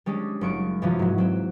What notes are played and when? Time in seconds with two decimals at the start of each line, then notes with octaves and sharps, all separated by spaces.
0.06 G3 G#3 C#4 D4
0.41 F#1 F#3 C#6 D7
0.82 F#2 C3 E3 F3 C#4
0.99 G#2 F#3
1.18 F#3 C4